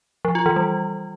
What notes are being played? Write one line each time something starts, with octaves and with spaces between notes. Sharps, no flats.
F3
F4
E3
G3